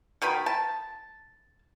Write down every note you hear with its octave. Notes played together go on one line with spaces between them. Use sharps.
B2 D#3 G5 B5
A5